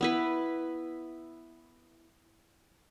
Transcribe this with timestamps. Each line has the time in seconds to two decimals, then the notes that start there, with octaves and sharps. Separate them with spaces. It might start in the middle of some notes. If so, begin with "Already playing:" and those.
0.01 B3 E4 B4